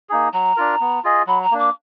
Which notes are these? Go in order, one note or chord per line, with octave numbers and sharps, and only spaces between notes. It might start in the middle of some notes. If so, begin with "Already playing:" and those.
A#3 D#4 G#4
F#3 A#5
D4 F4 A#4
B3
F4 G#4 D#5
F#3 B5
A#5
A#3 D4
D6